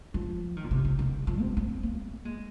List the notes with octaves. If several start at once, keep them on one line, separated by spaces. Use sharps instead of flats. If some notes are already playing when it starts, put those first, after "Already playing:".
F3
D#3
A#2
C3
C3
D#3
F3
C4
C4
A#3
G#3